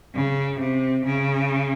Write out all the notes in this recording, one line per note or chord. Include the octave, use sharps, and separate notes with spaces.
C#3
C3
C#3